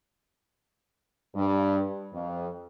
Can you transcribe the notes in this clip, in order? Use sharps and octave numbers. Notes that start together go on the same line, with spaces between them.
G2
F2